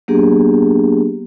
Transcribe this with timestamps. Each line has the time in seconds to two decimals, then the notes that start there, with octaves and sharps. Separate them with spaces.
0.08 F#3 A#3 B3 D4 G4 G#4